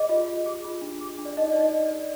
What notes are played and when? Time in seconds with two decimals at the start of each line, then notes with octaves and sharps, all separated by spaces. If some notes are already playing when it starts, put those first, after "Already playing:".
Already playing: G#4 D#5
0.09 F4
0.27 F4
0.46 G#4
0.64 F4
0.82 D4
1.01 G#4
1.18 D4
1.25 D5
1.37 D#4 D#5
1.52 D#4 D5
1.61 D#5
1.73 D#4
1.86 D5
1.91 A#4